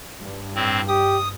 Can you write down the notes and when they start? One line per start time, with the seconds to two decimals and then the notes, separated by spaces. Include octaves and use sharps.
0.20 G2
0.55 A2 C4
0.88 G4 D#6